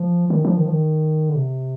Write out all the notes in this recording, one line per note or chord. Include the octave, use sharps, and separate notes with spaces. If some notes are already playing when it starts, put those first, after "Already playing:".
Already playing: F3
D#3
F3
D#3
F3
D#3
D3
C3